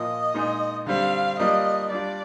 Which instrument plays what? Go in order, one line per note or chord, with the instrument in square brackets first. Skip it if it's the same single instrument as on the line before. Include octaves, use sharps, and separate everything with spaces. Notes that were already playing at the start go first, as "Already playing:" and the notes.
Already playing: [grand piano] A#2 F3 A#3 F4 [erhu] D#5
[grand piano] A#2 G#3 D#4
[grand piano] D3 G3 C4 [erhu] F5
[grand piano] G3 A#3 D4 F4 [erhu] D#5
[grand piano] G3 D4 F4 [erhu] D5